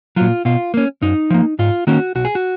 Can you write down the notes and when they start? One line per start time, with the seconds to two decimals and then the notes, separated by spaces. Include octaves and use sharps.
0.16 A#2 F#3 F4
0.45 B2 F4
0.74 A#3 C#4
1.02 F#2 D#4
1.30 F3 A#3
1.59 G#2 F4
1.87 D#3 A#3 C#4 F#4
2.15 B1 F#4
2.25 G#4
2.35 F#4